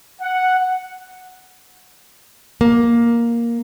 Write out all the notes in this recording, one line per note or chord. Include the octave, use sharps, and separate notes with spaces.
F#5
A#3